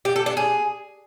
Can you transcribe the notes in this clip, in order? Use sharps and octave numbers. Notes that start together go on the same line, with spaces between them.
G4
A4
D4
G#4